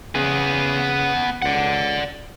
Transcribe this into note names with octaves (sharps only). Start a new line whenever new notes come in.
C#3 B3 G#4
C#2 D5 F#5